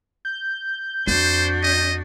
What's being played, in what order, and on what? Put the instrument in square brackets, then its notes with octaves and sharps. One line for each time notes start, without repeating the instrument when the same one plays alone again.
[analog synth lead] G6
[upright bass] F2 [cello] D4 F#4 [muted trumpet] C5
[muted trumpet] D#5